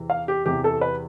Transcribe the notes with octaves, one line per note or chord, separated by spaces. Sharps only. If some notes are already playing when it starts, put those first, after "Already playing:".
Already playing: E2 C3 E3
F5
G4
E2 C3 E3 G4
A4
B4